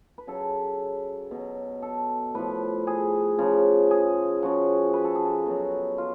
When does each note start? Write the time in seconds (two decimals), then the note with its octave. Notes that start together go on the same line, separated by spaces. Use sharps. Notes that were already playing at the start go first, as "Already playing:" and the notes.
0.18 B4
0.27 C#3 F#3 A4
1.31 B2 F#3
1.82 A4
2.35 A2 F3 B4
2.87 G#4
3.38 C#3 F3
3.91 G#4
4.42 C#3 F3 F#4
4.94 B4
5.04 A4
5.15 G#4
5.25 A4
5.46 B2 F#3
5.98 F4